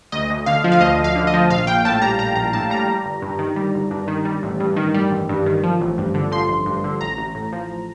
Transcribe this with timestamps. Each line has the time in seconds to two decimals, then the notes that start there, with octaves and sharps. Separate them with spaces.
0.12 D2 D#5
0.30 D2
0.46 D3 F5
0.64 F3
0.72 F5
0.81 D2 D#5
0.99 D2
1.04 F5
1.15 D3
1.27 D#5
1.33 F3
1.50 A#1 F5
1.67 A#1 G5
1.85 A2 A5
2.02 G3 A#5
2.19 A#1 A#5
2.36 A#1 A#5
2.53 A2 A5
2.70 G3 A#5
2.88 G3
3.05 G1
3.22 G2
3.39 D#3
3.56 G3
3.74 G1
3.91 G2
4.08 D#3
4.25 G3
4.43 A1
4.60 G2
4.76 D#3
4.94 G3
5.11 A1
5.29 G2
5.46 D#3
5.63 F3
5.81 A1
5.98 G2
6.14 D3
6.32 F3 C6
6.49 A1
6.66 G2
6.84 D3
7.01 A1 A#5
7.18 A1
7.35 A2
7.52 F3